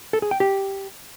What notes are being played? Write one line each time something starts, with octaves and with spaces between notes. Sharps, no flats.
A4
G#4
G5
G4